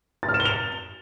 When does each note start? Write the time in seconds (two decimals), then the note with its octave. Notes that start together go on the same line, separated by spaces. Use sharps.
0.23 A6
0.29 F6
0.34 E7
0.40 G7
0.45 F7